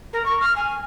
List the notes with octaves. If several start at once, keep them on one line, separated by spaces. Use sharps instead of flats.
A#4
C#6
F6
G#5